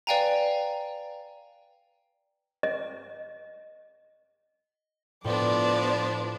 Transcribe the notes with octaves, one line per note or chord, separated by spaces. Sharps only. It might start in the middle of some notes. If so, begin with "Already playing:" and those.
B4 D5 F5 G5 G#5 A#5
D#5
A2 F3 B3 D4 D5